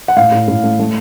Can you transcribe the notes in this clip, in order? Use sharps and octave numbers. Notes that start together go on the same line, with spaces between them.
F#5
A2 F5
A2
A2
A3
A3